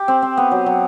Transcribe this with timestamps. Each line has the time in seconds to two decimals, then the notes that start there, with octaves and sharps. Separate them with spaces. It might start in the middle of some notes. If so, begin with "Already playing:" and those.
Already playing: G4
0.08 C4
0.22 C4
0.37 B3
0.52 F#3
0.66 F#3